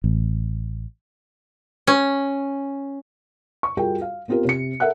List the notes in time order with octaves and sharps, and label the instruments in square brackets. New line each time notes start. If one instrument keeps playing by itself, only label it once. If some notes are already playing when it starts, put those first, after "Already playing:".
[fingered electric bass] A1
[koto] C#4
[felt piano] C#6
G3 F4 F#4 G#4 A#4 G5
F5
B3 C4 F4 G4 A#4
C3 C#7
A4 A#4 E5 F#5 F#6